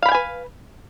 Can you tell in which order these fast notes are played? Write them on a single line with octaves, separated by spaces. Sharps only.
F5 B5 G5 G#5 B4